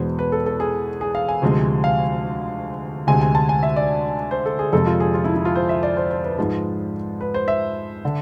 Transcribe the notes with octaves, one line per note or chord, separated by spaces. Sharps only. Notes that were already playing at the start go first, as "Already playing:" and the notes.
Already playing: E2 B2 G#3 C5
B4
A4
A4
G#4
G#4
F5
G#5
D2 C3 F3 G#3
F5
D2 C3 G#3 G#5
G#5
A5
G#5
E5
D5
C5
A4
G#4
F2 C3 G#3 A4
F4
G#4
F4
E4
E4
F4
C5
E5
D5
C5
C5
B4
G#2 F3 G#3
B4
C5
E5
D3